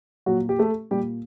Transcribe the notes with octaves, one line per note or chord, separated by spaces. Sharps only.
A#2 F#3 F#4
G4
A3 A4
A#2 G3 G4